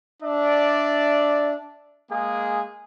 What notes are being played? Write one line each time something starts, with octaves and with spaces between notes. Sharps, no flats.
D4 D5 E5
G#3 A#3 G#4